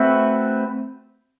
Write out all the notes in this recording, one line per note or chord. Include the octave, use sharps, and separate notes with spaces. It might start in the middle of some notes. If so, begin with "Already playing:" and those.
Already playing: A3 C4 F#4 B4 E5